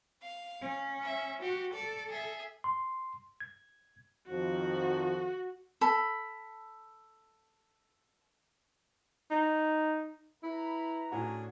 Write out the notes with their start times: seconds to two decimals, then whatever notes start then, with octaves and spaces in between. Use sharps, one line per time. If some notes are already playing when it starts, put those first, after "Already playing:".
0.23 F5
0.61 C#4
1.03 E5
1.42 F#4 G4
1.73 A4 D5
2.09 G#4 E5
2.64 C6
3.40 G#6
4.29 F2 D#3 F3 F#4
5.81 A4 B5
9.31 D#4
10.43 E4 B4 A#5 B5
11.12 A2 C#4 D4 F#4 G#4